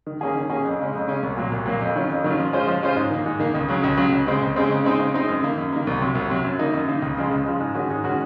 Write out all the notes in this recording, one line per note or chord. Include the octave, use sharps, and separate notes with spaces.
D#3
A#3 C#4 G#4
D#3
A#3 C#4 G#4
F2
C#3 G#3 C#4
F2
C#3 G#3 C#4
C2
A#2 F#3 A#3
C2
A#2 F#3 A#3
F2
D#3 F#3 C#4 F4
F2
D#3 F#3 C#4 F4
F3
G#3 C#4 F4 C5
F3
G#3 C#4 F4 C5
G#2
D#3 A#3
G#2
D#3 A#3
C#2
C#3 F#3
C#2
C#3 F#3
C#2
C#3 G#3 C4
C#2
C#3 G#3 C4
C#3
G#3 C4 D#4
C#3
G#3 C4 D#4
F#2
D#3 A#3
F#2
D#3 A#3
C2
C3 F#3
C2
C3 F#3
F#2
D#3 A#3 D#4
F#2
D#3 A#3 D#4
C#2
C#3 F3 G#3
C#2
C#3 F3 G#3
G#2
D#3 G#3 C#4 F#4
G#2
D#3 G#3 C#4 F#4